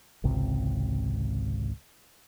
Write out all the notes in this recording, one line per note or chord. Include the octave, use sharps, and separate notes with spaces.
G#1 C#2 C3